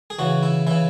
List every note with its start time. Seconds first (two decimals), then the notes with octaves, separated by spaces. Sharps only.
0.10 G#4
0.19 C#3 E3 F#4
0.43 E4
0.67 C#3 E3 E4